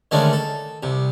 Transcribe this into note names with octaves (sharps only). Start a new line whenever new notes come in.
D3 D#3 G#3 A3 C#4 D4
A4
C2 C3